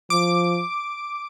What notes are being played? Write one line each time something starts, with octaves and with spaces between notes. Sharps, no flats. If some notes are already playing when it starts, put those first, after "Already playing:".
F3 D6